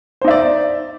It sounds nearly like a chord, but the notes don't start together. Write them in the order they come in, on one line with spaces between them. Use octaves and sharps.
C5 D#4 E5 D5